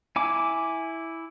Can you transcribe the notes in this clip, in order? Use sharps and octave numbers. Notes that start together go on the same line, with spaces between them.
E4 G#5 D6